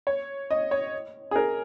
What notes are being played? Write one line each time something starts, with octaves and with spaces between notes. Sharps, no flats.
C#5
D#5
C#5
G#4
A#4